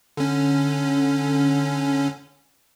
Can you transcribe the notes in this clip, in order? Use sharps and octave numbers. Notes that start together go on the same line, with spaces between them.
D3 C#4